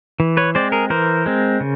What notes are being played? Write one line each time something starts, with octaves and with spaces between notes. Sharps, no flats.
E3
B4 C#5
G#3 C4 C5 D5
G#4 A#4
E3 A#4 C5
G#3 C4
C#3